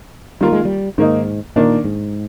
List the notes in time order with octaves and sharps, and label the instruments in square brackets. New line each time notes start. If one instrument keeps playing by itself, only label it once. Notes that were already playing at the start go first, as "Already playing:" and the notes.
[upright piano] D#3 A#3 F4 A#4 [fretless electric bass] G3
[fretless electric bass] G#3
G3
[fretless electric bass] G#2 [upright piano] D#3 A#3 D#4
[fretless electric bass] A#2 [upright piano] D#3 A#3 D4
[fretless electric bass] G#2